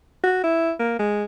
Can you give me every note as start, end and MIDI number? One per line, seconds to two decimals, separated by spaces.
0.24 0.41 66
0.44 0.72 64
0.79 0.97 58
0.99 1.24 56